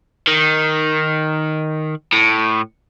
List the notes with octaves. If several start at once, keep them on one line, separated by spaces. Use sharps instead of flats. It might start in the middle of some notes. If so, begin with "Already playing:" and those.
D#3
A2